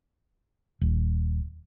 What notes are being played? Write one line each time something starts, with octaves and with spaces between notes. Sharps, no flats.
D#1